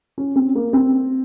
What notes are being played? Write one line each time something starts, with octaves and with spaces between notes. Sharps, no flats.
C#4
C4
A#3
C4